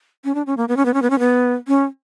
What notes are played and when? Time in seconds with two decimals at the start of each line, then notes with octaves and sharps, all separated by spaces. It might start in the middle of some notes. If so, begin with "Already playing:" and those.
0.24 C#4
0.35 D4
0.46 C#4
0.57 A#3
0.68 B3
0.77 C#4
0.85 B3
0.94 C#4
1.02 B3
1.10 C#4
1.19 B3
1.68 C#4